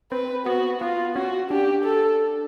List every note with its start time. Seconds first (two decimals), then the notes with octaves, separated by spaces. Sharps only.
0.12 C4 B4
0.46 B3 F#4
0.81 B3 F4
1.16 C#4 F#4
1.51 D4 G4
1.85 A4